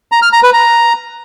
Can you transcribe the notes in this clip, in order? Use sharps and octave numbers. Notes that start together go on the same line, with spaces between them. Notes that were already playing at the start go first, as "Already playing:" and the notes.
A#5
F6
A#5
B4
A#5